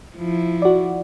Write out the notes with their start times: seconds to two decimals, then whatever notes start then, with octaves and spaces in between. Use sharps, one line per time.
0.16 F3 E4
0.62 F#4 D5